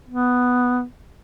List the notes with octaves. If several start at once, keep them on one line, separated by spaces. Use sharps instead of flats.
B3